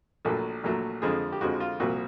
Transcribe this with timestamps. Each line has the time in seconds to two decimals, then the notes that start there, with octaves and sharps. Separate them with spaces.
0.25 A#1 A#2 F#3 A3 A4
0.63 A#1 A#2 F#3 A3
1.02 F2 D3 F3 G#3 G#4
1.32 G4
1.41 F2 D3 F3 G#3 F#4
1.60 F4
1.80 C2 A#2 F3 F#4